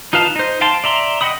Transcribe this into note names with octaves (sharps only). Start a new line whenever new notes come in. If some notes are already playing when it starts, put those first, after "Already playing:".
D#4 F4 B4 F5 A5
D#4 C5
F5 G5 A5 C6
D5 E5 A#5 C6
D#5 F#5 G5 B5 D#6